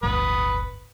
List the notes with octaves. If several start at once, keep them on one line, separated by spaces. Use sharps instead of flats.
D1 G1 D2 B4 D#6